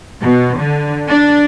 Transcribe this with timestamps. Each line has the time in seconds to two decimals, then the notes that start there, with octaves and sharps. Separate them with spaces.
0.22 B2
0.59 D3
1.08 D4